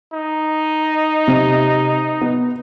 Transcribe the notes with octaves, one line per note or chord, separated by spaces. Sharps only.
D#4
C3
B3